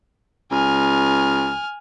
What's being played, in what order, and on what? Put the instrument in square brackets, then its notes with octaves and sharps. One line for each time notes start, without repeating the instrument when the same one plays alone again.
[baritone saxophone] C#2 [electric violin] G#5 F6